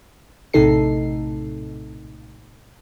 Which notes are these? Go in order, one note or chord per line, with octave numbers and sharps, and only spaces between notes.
A#1 A2 C3 D#4 A4 C7